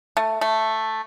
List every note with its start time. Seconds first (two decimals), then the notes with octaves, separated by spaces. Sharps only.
0.17 A3
0.41 A3